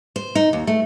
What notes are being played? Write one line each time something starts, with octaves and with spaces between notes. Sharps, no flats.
C5
D#4
D#2
A3